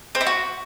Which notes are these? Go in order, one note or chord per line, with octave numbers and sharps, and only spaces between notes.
C4
E4
F#4